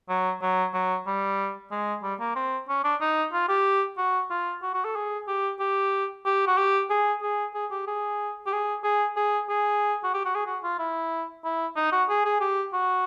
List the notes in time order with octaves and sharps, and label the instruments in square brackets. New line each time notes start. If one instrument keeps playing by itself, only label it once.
[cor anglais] F#3
F#3
F#3
G3
G#3
G3
A#3
C4
C#4
D4
D#4
F4
G4
F#4
F4
F#4
F#4
A4
G#4
G4
G4
G4
F#4
G4
G#4
G#4
G#4
G4
G#4
G4
G#4
G#4
G#4
G#4
F#4
G4
F#4
G#4
F#4
F4
E4
E4
D#4
F#4
G#4
G#4
G4
F#4